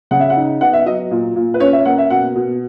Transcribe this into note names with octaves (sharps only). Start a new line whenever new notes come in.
C#3 F#5
E5
F#5
D#4
B3 F#5
E5
F#3 D#5
A#2
A#2
B4
C#4 C#5
E5
A#3 F#5
E5
B2 F#5
B2